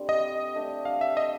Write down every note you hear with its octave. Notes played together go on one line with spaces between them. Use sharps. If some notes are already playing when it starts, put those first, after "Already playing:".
Already playing: D3 G3 C4
D#5
A3 D4 G4
F5
E5
D#5